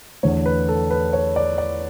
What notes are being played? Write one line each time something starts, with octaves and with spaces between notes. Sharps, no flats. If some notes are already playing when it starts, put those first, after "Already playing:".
E2 D3 A3 C#5
B4
A4
B4
C#5
D5
D5